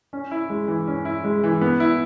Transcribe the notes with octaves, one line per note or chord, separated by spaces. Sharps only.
C#4
E4
G#3
E3
C#4
E4
G#3
E3
B3
E4